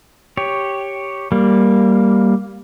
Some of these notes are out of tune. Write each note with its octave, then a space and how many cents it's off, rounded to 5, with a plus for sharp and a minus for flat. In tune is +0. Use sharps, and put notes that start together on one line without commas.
G4 +0 C#5 +0
G3 +0 A#3 +0